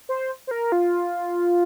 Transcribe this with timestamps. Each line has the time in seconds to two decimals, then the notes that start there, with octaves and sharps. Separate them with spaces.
0.09 C5
0.47 C5
0.51 A#4
0.72 F4